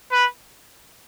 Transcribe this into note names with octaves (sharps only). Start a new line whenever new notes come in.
B4